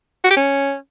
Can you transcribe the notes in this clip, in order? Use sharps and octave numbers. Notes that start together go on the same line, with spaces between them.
F#4
G4
C#4